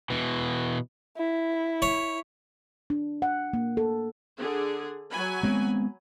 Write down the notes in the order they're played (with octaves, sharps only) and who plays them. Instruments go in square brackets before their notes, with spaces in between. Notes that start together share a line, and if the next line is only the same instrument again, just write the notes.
[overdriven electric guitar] B2 E3
[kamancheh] E4
[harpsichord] C#5
[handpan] D4
F#5
A#3
A4
[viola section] D3 G#4
F#3 G#5 B5
[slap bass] G#3 B3 C4